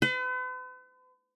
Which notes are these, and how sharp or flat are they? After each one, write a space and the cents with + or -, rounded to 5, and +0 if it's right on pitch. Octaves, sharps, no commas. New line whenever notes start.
B4 +45